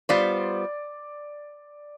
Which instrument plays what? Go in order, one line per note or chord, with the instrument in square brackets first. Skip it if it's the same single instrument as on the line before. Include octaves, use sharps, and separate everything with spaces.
[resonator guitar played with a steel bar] G3 B3 F4 C5 [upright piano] D5